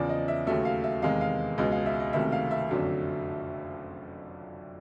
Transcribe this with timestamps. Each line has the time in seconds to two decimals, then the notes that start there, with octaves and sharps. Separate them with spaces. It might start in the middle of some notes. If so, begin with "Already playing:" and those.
Already playing: E2 C#3 F3 D5
0.09 D#5
0.28 E5
0.47 D#2 C#3 F#3 A3 E5
0.65 F5
0.84 E5
1.02 E2 C3 D#3 G#3 F5
1.21 F5
1.58 C#2 B2 G#3 D#5
1.72 F5
1.86 E5
2.00 D#5
2.13 C#2 C3 D#3 F#3 A3 E5
2.32 F5
2.51 E5
2.69 F#1 F2 D3 F#3 A3